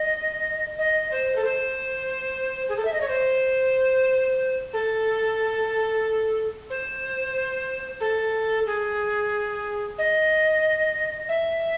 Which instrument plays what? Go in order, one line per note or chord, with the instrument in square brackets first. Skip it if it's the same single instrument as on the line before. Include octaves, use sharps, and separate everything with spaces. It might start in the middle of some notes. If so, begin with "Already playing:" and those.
Already playing: [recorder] D#5
D#5
C5
A4
C5
G#4
A4
E5
D#5
C#5
C5
A4
C5
A4
G#4
D#5
E5